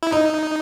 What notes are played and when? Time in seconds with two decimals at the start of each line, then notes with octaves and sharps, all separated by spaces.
0.03 E4
0.12 D#4 D#5